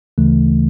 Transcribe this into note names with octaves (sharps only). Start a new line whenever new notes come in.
D2 C#3 E3 A3